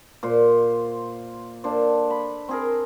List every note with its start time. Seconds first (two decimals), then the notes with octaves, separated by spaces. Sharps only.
0.23 A#2 C5
1.64 A#3 D4 A4 C5
2.10 B5
2.49 C4 G#4 A#4